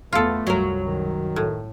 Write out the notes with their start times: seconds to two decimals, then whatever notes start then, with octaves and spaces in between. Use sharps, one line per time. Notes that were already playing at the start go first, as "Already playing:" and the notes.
0.13 E2 A3 B3 F4 A4
0.47 C2 F#2 F#3 A#4
0.85 D#3
1.36 A2